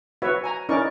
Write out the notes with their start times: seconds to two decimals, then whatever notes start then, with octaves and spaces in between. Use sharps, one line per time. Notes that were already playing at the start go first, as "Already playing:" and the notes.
0.22 F#4 B4 C#5 E5
0.44 G#5 A#5
0.69 C#4 D#4 E4 A#4 D5 C#6